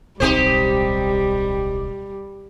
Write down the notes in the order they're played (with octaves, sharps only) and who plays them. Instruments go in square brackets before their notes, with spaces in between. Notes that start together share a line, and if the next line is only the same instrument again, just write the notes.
[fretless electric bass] D1 B1 C4 [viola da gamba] G3 [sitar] D#4 G4 C5